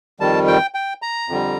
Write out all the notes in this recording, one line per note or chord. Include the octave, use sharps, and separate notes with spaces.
F2 D#3 G3 A5
G5
G5
A#5
F2 D3 G3